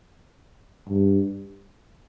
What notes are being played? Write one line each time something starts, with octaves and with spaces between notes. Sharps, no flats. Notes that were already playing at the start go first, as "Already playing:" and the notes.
G2